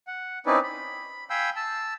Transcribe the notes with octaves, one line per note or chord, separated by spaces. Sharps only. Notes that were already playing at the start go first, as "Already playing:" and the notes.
F#5
C4 C#4 D#4 E4 B4 D5
B5
F5 G5 G#5 B5 E6 G6
A5 E6